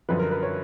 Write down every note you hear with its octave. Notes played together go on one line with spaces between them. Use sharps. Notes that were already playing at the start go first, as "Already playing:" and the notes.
F#2 D3 F3 B4
A#4
B4
C#5